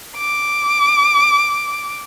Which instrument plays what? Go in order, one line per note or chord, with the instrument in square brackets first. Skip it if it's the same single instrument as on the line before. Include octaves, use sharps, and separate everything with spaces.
[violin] D6